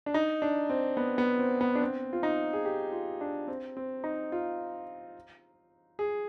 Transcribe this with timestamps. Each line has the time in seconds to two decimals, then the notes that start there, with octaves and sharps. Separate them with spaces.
0.06 D4
0.14 D#4
0.42 D4
0.70 C4
0.97 B3
1.18 B3
1.39 C4
1.61 B3
1.75 D4
1.81 C4
2.13 F4
2.23 D#4
2.53 G#4
2.65 G4
2.92 F4
3.21 D4
3.48 C4
3.77 C4
4.04 D#4
4.32 F4
5.99 G#4